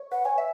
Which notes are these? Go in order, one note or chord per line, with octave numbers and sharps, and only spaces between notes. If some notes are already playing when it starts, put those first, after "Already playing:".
Already playing: C#5
B4 F#5
C#5 G#5
E5